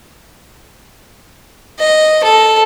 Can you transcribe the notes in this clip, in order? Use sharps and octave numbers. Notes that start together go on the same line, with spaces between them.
D#5
A4